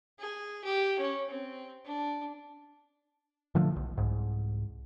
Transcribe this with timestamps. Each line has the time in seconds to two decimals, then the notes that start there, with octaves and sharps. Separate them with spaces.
0.18 G#4
0.64 G4
0.99 C#4
1.29 C4
1.85 D4
3.55 A#2 D3 F3 A3
3.76 B1
3.97 C2 G#2